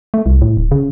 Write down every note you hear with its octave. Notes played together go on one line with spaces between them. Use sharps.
A3
C2
A2
D1
C#3